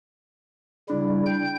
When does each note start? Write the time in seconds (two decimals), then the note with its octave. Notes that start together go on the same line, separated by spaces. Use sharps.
0.90 C#3 G3 D4 E4
1.26 G5 G6